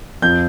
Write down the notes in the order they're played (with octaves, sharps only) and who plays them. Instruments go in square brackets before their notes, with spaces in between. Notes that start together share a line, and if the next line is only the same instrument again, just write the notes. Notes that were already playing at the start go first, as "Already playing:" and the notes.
[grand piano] F2 G6